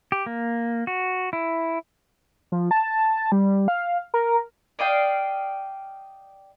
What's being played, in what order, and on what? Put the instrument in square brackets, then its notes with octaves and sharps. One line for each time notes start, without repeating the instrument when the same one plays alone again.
[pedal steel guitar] G4
A#3
F#4
E4
[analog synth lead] F3
A5
G3
F5
A#4
[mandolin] D5 D#5 F5 G5